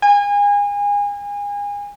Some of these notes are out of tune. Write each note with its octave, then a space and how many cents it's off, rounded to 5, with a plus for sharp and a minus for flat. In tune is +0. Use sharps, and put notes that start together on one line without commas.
G#5 -30